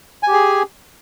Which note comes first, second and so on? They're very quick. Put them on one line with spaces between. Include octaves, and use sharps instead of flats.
G#5 G4 G#4